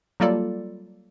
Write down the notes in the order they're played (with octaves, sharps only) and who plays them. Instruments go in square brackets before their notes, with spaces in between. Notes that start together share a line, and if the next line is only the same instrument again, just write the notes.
[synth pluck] F#3 G3 A#3 F4 A4 D5